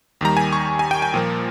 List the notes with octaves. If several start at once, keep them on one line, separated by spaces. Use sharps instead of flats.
D#2 D#3 G3 A#5
G#5
C#6
G#5
G5
G#5
A#2 F3 A#3